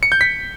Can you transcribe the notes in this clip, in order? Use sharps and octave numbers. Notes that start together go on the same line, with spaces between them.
C#7
G6
B6